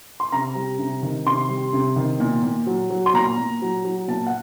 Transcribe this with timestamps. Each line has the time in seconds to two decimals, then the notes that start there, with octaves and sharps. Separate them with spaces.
0.20 C6
0.32 C3 A#5
0.55 G3
0.79 C3
1.03 D#3
1.26 C3 C6
1.49 G3
1.73 C3
1.96 D#3
2.20 A#2
2.43 A#2
2.67 F#3
2.90 F#3
3.06 C6
3.14 A#2 A#5
3.38 A#2
3.62 F#3
3.85 F#3
4.08 A#2 A5
4.27 F#5